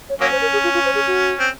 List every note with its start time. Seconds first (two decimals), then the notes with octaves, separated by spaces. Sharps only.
0.09 C#5
0.20 F#3 A#3 C#4 C#5
0.32 C5
0.41 A#4
0.53 G#4
0.64 F4
0.74 F4
0.85 C5
0.95 G#4
1.07 F#4
1.40 C4